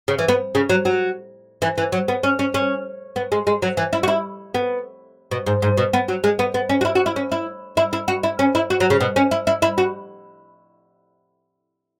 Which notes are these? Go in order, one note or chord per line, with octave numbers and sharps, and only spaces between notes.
C#3
E3
B3
C#3
F#3
F#3
E3
E3
F#3
B3
C#4
C#4
C#4
B3
G#3
G#3
F#3
E3
E4
F#4
E4
B3
B2
G#2
G#2
B2
B3
F#3
G#3
B3
B3
C#4
F#4
E4
F#4
E4
C#4
E4
E4
E4
F#4
E4
C#4
E4
F#4
F#3
C#3
B2
C#4
E4
E4
E4
F#4